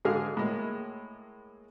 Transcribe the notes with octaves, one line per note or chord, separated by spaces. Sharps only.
G#2 D3 G#4 F5 F6
A2 G#3 A#3